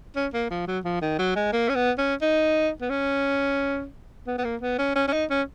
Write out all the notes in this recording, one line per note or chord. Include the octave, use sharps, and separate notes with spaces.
C#4
A#3
F3
F#3
F3
D#3
F#3
G#3
A#3
C#4
B3
C#4
D#4
B3
C#4
B3
B3
A#3
B3
C#4
C#4
C#4
D#4
C#4